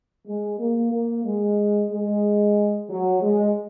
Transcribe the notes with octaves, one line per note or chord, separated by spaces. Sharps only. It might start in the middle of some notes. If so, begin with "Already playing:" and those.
G#3
A#3
A#3
G#3
G#3
F#3
G#3